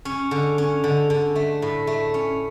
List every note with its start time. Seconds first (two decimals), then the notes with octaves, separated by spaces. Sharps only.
0.05 C#4
0.31 D3
0.58 C#4
0.84 D3
1.10 D3
1.35 A3
1.62 A2
1.87 A3
2.14 C#4